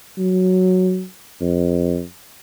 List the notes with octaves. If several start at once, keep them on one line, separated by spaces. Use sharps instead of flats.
F#3
F2